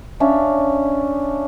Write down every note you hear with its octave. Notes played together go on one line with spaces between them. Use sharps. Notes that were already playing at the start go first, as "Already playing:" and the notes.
C#4 D4 E5 F5